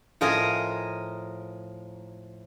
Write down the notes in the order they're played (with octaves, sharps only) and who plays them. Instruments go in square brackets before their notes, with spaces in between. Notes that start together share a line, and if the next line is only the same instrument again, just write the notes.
[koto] A2 F3 A#4 D#5 G#5 A#5